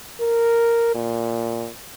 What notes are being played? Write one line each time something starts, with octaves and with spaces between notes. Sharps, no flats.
A#4
A#2